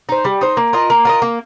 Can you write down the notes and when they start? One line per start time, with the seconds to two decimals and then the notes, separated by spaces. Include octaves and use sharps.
0.09 D#4 C5
0.25 G3
0.41 D#4 C5
0.57 A#3
0.73 F4 A#4 D#5
0.90 A#3
1.05 F4 A#4 D#5
1.22 A#3